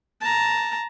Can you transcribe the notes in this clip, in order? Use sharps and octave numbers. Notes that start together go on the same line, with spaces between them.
A5 A#5